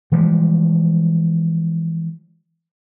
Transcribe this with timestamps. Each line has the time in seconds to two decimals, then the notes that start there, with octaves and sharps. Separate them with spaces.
0.12 E3 F3 G3 G#3